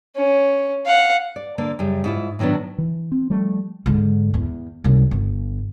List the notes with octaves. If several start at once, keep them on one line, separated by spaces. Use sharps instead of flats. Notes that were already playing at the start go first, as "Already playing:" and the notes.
C#4
F5 F#5
D5
D3 A#3 D5
F#2 C#3 G3
G#2 E4 F4
A2 D#3 F#3 B3 D4
E3
C4
F3 G3 A3
G#2 D3
E2
C2 C#4
G1